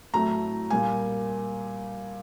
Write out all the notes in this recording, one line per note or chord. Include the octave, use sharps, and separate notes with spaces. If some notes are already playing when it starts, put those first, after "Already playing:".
A2 F#3 A3 A#5
A#2 G3 A#3 G#5